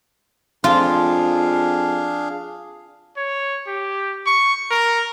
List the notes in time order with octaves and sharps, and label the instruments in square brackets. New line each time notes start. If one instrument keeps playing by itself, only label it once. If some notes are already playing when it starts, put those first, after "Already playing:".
[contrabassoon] F2 [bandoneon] D4 G#4 F5 [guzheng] F4
[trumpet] C#5
G4
C#6
A#4